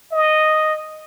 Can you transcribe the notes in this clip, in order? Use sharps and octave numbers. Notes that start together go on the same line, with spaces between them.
D#5